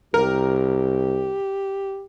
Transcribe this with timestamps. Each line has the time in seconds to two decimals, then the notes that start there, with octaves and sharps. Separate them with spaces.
0.14 C2 G4 A#4